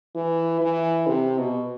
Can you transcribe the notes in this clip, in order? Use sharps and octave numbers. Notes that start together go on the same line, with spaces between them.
E3
E3
C3
B2